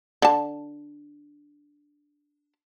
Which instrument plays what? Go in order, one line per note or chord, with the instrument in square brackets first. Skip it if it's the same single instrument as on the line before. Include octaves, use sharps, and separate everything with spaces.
[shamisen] D3 A5